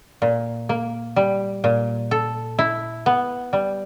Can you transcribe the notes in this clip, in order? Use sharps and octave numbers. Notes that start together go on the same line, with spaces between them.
A#2
A#3
G3
A#2
A4
E4
B3
G3